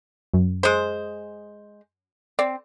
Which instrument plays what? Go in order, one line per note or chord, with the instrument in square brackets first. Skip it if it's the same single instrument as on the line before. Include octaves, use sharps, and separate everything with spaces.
[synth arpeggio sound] F#2
[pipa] G#3 C5
[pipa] C4 [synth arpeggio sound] D5